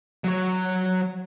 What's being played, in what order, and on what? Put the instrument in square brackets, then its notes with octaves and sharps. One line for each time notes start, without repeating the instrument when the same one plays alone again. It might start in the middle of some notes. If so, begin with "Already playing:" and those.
[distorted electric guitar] F#3 C#5